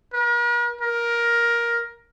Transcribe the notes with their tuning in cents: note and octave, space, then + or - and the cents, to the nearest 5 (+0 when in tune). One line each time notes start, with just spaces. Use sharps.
A#4 +45
A#4 +15